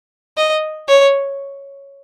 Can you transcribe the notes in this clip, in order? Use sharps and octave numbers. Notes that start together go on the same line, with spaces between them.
D#5
C#5